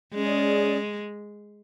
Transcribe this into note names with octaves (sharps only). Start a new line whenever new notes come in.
G#3 C#4 G#4 D5